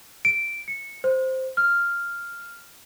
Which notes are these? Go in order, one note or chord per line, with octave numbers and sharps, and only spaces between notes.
D7
C#7
C5
F6